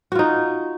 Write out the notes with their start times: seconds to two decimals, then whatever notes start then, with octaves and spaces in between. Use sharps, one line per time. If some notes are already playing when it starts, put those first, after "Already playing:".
0.12 F#4
0.15 F4
0.19 D#4